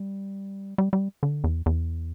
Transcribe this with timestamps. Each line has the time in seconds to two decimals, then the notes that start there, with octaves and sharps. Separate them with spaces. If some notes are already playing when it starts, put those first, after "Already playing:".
Already playing: G3
0.78 G3
0.93 G3
1.23 D3
1.44 E2
1.66 E2